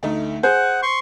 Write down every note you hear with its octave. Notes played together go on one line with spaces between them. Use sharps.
D2 A3 D#4
G#4 C5 F#5 G#5
C6 C#6